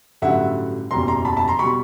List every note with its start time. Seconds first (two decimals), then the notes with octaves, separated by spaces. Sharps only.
0.22 A1 G2 D3 F#3 E5 F#5
0.91 F#1 E2 B2 G3 A#5 C6
1.08 A#5 C6
1.25 A5 B5
1.37 A5 B5
1.48 A#5 C6
1.59 B2 G3 B5 C#6